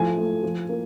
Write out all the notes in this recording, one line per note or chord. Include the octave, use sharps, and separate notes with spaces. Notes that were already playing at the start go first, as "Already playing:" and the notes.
Already playing: F3 A3 G#5
A3
F3
A#3